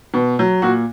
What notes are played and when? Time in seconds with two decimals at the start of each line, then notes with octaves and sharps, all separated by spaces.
0.14 B2
0.39 F#3
0.62 A#2 F#4